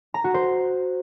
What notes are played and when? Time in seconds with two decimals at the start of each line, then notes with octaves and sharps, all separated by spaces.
0.14 A#5
0.24 F#4
0.34 C5